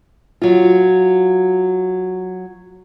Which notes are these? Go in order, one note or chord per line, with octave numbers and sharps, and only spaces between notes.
F#3 F4